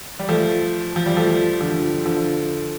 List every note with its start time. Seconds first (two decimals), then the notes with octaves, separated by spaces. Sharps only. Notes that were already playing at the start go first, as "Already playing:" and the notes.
0.20 G3
0.29 F3 A3
0.96 F3
1.06 G3
1.16 F3 A3
1.60 D3 F3
2.05 D3 F3